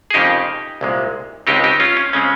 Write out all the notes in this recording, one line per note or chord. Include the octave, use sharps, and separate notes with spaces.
G#4
F2 C#3 F3 A#3 D#4 G4
C2 A#2 G#3
C#2 C#3 G#3 C4 D#4 G4
D#4 G4
C#4 F4
C#4
C#3 G#3 C4 C#4